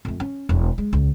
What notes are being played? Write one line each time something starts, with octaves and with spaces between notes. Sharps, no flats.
F2 A3
C#4
E1
G#3
C#2